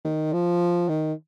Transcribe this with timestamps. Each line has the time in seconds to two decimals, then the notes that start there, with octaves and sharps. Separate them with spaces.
0.05 D#3
0.33 F3
0.89 D#3